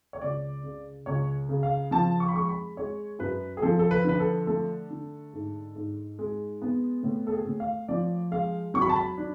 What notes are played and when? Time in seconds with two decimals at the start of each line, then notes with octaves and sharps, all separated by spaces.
0.13 C#5
0.21 C#2 D5
0.63 C#3
1.06 C#2 C#5
1.49 C#3
1.63 F5
1.91 F3 A5
2.20 C#6
2.28 B5
2.35 G#3 C#6
2.49 B5
2.77 G#3 C#5
3.19 F#2 B4
3.57 G#4
3.62 F3 A4
3.79 A4
3.91 B4
4.04 D3 B4
4.20 A4
4.47 A3 A4
4.90 D3
5.33 G#2
5.76 G#2
6.19 G#3
6.62 B3
7.03 A2
7.27 A4
7.32 G#4
7.46 A2
7.60 F5
7.88 F3 D5
8.31 G#3 F5
8.74 F#3 C#6
8.82 B5
8.89 A5
8.96 B5
9.18 D4